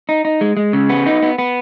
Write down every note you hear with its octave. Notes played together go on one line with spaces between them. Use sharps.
D#4
D#4
G#3
G#3
C#3
B3
D#4
B3
B3